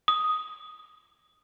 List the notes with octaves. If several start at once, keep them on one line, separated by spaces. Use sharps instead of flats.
D#6